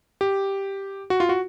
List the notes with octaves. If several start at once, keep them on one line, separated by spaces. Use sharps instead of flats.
G4
F#4
F4
F#4